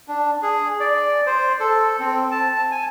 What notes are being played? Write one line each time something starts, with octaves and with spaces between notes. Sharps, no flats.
D4
G#4
D5
C5
A4
C4
A5
G#5